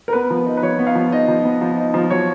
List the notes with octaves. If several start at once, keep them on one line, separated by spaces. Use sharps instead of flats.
A#4
B3 B4
F3
D#4
B4
F3 C#5
B3
F5
F3
D#4 D#5
F3
B3
F3
D#4
F3
F#3 C#5